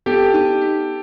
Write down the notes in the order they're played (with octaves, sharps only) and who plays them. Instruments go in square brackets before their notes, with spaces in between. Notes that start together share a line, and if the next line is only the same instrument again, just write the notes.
[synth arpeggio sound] B3 [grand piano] G4 A4
[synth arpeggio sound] D#4
B3